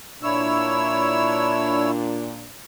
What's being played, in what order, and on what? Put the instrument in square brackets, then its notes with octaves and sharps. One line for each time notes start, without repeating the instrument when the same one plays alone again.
[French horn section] A#2 D4 [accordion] E4 C#5 E6